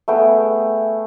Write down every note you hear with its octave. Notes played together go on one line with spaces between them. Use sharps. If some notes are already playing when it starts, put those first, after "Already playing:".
A3 B3 G#4 G5